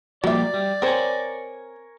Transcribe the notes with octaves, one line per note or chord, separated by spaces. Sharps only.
F3 G3 A#3 F#4 D5 E5
G3
C4 A#4 C5 C#5 G#5